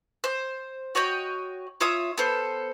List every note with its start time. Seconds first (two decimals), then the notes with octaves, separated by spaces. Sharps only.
0.24 C5
0.95 F#4 C#5 D#5 G5
1.81 F4 C#5 E5 D#6
2.18 B3 A4 C5